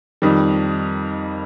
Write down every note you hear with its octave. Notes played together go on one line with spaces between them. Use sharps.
F2 D#3 G3